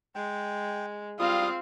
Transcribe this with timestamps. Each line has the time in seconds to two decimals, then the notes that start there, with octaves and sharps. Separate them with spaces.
0.15 G#3 G5
1.19 G3 C4 F4 F5 D#6